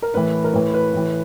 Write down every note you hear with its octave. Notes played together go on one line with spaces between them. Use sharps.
A#4
A2 E3 B4
A#4
A2 E3 B4
B4
A2 E3